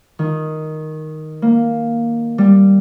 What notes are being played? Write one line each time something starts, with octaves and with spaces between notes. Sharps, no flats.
D#3
A#3
G3